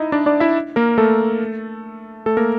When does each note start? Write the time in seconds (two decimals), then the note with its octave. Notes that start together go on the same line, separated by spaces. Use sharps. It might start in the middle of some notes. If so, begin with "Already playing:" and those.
Already playing: D#4 E4 D#5
0.12 D4 D5
0.26 D4 D5
0.40 E4 E5
0.76 A#3 A#4
0.98 A3 A4
2.26 A3 A4
2.37 A#3 A#4